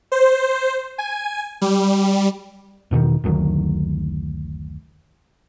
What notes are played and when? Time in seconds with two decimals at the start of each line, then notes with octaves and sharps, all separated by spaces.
0.12 C5
0.98 G#5
1.61 G3
2.91 E2 B2 D3 D#3
3.24 F#1 D2 D#3 F#3